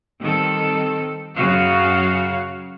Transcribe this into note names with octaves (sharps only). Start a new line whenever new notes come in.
D#3 G3 C4 A4
F#2 C#3 F#4 F5